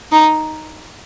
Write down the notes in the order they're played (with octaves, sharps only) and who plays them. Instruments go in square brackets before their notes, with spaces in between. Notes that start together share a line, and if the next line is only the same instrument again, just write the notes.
[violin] D#4